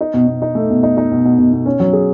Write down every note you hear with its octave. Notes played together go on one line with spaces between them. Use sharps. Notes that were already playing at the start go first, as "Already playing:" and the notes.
D#4
B2
B2
D#4
A3
B2
D#4
D#4
B2
B2
B2
B2
C#4
F#3
G#4